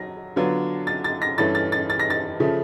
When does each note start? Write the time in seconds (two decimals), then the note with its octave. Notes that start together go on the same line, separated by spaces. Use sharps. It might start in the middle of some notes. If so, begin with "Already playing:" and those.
Already playing: F#3 A#6
0.36 D3 F#3 B3 D4 F4
0.87 A6
1.04 A6
1.22 A#6
1.38 G2 E3 A3 C#4 A6
1.55 A6
1.72 A6
1.90 A6
2.00 A#6
2.10 A6
2.40 C#3 F3 A3